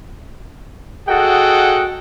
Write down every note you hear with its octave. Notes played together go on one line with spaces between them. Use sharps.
F#4 G#4 A4 D#5 F#5 G5